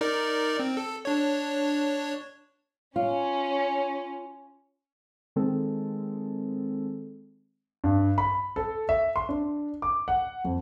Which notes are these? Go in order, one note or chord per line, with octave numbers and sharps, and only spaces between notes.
D#4 A#4 D5
C4
A4
D4 C#5
C#4 F4
D#3 G#3 C4 A4
G2
B5
A4
E5
C6
D4
D6
F#5
F2